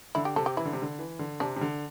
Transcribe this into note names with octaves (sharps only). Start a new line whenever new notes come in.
D3 E4
G4
C3 A4
G4
E3 E4
D3
C3
D3
E3
D3
C3 D4
C3
D3